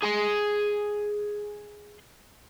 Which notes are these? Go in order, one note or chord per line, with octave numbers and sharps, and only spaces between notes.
G#4 C6